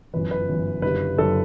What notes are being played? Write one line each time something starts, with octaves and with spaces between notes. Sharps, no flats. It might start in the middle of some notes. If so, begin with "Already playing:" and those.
G1 F#2 E3 B4
B4
G1 F#2 E3
F#1 F#2 D3 G3 B4
F#1 F#2 D3 G3 A4